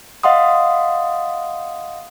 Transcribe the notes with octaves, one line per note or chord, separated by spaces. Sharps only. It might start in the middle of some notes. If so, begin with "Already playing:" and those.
D#5 F5 F#5 C6 D#6